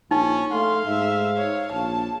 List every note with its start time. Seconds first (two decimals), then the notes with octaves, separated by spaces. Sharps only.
0.11 A#1 C#4 D#4
0.52 A3 F5 C6
0.86 G#2 E5
1.37 C#5
1.72 A#1 A5